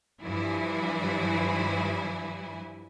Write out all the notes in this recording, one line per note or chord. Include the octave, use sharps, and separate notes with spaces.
G2 E3 F3 E4 G#5